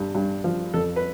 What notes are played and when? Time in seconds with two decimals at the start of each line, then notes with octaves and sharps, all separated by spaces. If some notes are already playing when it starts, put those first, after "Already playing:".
Already playing: G2
0.15 G2
0.44 F3
0.74 F2 A4
0.96 B4